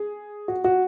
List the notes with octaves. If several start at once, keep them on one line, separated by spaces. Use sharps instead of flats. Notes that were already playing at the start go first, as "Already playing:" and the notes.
Already playing: G#4
F#4
F#4